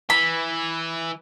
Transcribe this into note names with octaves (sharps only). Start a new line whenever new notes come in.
E3 B5